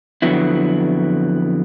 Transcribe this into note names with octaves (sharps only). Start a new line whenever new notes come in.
F2 D3 F#3 B3 E4